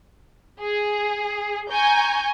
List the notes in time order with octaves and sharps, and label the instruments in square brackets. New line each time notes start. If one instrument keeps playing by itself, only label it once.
[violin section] G#4
G#5 A#5 C#6 G6